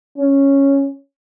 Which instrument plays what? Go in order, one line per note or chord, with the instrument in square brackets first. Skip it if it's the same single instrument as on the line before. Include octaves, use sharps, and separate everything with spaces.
[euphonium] C#4